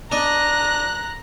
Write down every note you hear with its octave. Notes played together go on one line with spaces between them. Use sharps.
D4 D#5 A#5 F#6